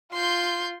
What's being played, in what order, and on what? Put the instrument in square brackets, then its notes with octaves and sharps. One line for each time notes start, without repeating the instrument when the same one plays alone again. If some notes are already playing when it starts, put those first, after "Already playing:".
[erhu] F4 [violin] C6 G6